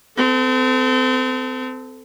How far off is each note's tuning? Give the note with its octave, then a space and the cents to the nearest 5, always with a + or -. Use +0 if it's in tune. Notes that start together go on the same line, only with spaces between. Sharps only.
C4 -35 A4 +0